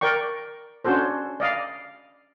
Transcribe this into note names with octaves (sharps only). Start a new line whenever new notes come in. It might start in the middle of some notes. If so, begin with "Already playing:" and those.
A#4 D5 G5 C#6
C#4 D4 F#4 A4 C5
D5 D#5 F5